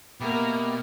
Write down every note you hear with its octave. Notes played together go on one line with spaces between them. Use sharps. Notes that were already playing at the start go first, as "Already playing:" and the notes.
B2 A#3 E4 G4 A#4